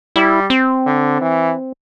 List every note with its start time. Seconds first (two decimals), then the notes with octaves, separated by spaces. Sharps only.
0.16 G3 E4
0.50 C4
0.86 D3
1.21 E3